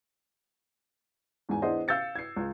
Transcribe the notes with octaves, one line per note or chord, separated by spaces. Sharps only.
E2 G#2 E3 G#5
E3 B3 D4 G#4 C5 D#5
F5 E6 G6 A6 C#7
G#6 C7
C#2